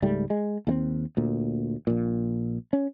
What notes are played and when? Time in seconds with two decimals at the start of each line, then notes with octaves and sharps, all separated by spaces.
0.02 C#2 G#2 G3 A3
0.30 G#3
0.67 D#2 G3 C4
1.17 D2 A#2
1.87 A#1 A#2
2.73 C#4